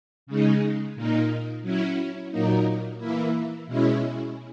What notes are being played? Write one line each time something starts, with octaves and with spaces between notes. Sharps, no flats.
C#3 G#3 D#4
A#2 A#3 D#4
F#3 C#4 E4
A#2 F#3 A#3 D#4
E3 A#3 E4
B2 G#3 C#4 E4